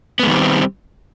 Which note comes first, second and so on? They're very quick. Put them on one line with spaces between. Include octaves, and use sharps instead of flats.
B3 G#3 D#3 G3 C4